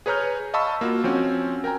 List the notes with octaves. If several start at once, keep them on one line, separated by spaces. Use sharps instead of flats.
G#4 B4 C#5 A#5 F6 G6
D#5 F5 A5 B5 C#6 E6
A#3 F4 F#4
F3 C4 C#4 F#4
A#4 G5 G#5 A#5